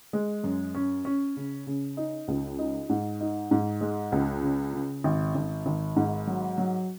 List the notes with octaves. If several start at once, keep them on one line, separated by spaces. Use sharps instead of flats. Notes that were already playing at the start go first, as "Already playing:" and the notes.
G#3
F#2
C#4
C#4
C#3
C#3
D#4
C#2
D#4
G#2
D#4
G#2
G#3
C#2
C#3
C#3
G#1
G#1
G#1
G#2
F#3
F#3